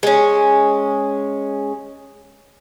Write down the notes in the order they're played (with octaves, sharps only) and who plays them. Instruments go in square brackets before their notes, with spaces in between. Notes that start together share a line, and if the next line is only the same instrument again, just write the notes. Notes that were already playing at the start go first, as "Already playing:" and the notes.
[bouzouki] G#3 C#4